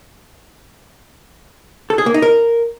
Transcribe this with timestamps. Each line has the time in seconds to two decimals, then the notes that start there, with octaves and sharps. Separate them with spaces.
1.90 A4
1.98 G#4
2.06 A#3
2.14 D#4
2.22 A#4